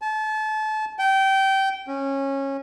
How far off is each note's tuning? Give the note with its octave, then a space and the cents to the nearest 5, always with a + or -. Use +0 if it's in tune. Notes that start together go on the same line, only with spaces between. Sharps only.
A5 -30
G5 -20
C#4 -20